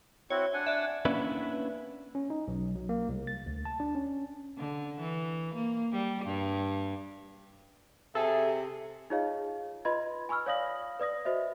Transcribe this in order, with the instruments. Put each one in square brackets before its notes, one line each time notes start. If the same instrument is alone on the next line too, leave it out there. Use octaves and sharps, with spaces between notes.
[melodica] C4 E4 F#4 [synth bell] C#5
[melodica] D4 F#5 G#5
[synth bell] D5 E5
[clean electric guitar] A#3 B3 C#4 D4 E4 B4
[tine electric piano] C#4
D#4
B1
F#3
A#3
C2
A6
D2
A5
D4
C#4
[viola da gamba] D3
E3
A#3
G3
G2
[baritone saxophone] C3 [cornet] G#4 [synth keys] A4 [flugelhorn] E5
[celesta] D#4 F4 G#4 C#5 D#5 F5
F4 B4 D#5 B5 C6 G#6
G#5 B5 C#6 E6 F6
C#5 D5 F5 D#6 A#6 F#7
B4 D5 D#6 A#6
F#4 C5 D#5 E5